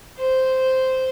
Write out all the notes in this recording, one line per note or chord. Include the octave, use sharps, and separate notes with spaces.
C5